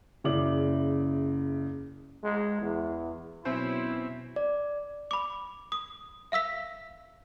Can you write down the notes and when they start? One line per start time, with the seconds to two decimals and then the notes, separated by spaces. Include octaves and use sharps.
0.24 F#1 C#3 E4 D5 D6 F#7
2.24 G#3
2.62 E2
3.45 B2 F#3 C4 C#4 E4 C5
4.36 D5
5.11 B5 D6
5.72 D#6
6.32 E5 F5 E6 B6